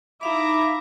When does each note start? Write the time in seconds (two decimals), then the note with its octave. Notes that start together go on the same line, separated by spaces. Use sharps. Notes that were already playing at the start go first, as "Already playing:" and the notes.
0.21 D#4 E4 E5 F5 A#5 B5 D6